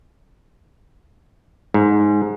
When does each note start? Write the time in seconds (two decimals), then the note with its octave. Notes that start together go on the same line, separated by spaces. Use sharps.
1.74 G#2